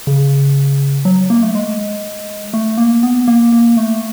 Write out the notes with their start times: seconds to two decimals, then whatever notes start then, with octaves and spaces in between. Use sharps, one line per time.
0.07 C#3
1.05 F#3
1.30 A#3
1.42 A3
1.55 G#3
2.54 A3
2.78 A#3
3.03 B3
3.28 A#3
3.52 A#3
3.77 A3